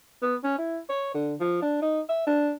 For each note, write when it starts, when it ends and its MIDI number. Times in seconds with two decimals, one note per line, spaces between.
0.22 0.35 59
0.44 0.55 61
0.58 0.79 64
0.89 1.10 73
1.14 1.35 50
1.40 1.62 53
1.62 1.79 62
1.82 2.00 63
2.09 2.25 76
2.27 2.51 62